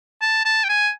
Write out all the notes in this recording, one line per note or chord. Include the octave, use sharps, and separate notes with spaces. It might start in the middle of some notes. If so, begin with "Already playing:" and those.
A5
A5
G5
G#5